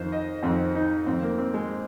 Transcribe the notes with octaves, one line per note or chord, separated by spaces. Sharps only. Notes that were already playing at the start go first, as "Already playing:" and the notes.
Already playing: F2 D#3 C5
D#5
F2 D#3 C4
D#4
F2 D#3 C4
A#3
C4
G#3